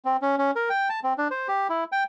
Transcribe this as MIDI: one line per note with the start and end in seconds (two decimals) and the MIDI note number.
0.05 0.17 60
0.22 0.36 61
0.38 0.51 61
0.56 0.69 70
0.69 0.89 79
0.89 1.00 81
1.04 1.13 60
1.18 1.28 62
1.31 1.48 72
1.48 1.67 67
1.69 1.84 64
1.92 2.04 79